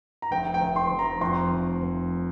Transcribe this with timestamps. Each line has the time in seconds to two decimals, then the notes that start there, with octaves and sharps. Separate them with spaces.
0.22 A#5
0.31 F1 G5
0.54 G5
0.61 F1
0.76 C6
0.91 F1
0.99 A#5
1.21 F2 C6
1.51 F1
1.81 F1